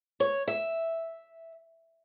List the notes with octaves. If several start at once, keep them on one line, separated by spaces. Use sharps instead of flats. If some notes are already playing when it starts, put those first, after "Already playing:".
C#5
E5